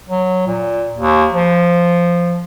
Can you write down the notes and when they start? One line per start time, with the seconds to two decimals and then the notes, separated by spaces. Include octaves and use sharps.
0.09 F#3
0.48 A#2
0.95 D#2
1.32 F3